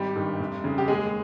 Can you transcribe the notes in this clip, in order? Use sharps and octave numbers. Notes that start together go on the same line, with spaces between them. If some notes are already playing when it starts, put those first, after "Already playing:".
Already playing: G#1 G3 G4
G2 D#3
F1
F2 C#3
G4
D#2 G#3 G#4